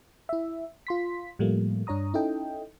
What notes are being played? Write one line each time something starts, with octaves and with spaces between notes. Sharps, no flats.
E4 E5
F4 C6 B6
A2 F3 G3 A3 A#3
G2 D4 C#5 A#5 D#6
C#4 D#4 E4 A4 D#5 G5